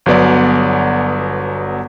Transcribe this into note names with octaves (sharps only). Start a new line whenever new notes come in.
G1 F#3 B3 D5